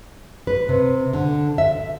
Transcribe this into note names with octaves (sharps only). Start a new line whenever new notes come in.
B4
C3
D3
E5